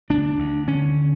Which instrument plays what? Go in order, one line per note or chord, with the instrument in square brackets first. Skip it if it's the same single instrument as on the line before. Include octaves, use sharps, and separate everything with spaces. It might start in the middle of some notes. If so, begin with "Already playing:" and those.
[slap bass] D2 D4
D2
D3 C#4